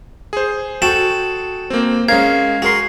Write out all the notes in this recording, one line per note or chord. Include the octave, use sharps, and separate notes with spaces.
G#4 C5
F#4 A4 G5 E7
A#3 C4
G#3 C#4 A#4 F5 G#6
F#4 G#4 A#4 C6